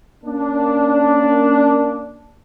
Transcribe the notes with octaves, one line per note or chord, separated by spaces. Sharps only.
A#3 C#4 D4